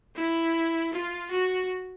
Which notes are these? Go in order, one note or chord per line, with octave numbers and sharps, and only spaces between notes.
E4
F4
F#4